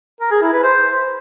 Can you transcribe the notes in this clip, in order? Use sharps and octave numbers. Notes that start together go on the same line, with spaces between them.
A#4
G#4
E4
B4
C5